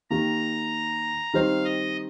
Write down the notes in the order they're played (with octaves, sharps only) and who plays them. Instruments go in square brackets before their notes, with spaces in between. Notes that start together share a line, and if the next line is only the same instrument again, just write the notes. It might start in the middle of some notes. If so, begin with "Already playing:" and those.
[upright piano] D#3 A#3 G4 [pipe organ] A#5
[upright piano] D#3 G3 C4 D#4 C5 [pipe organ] F5
[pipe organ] D#5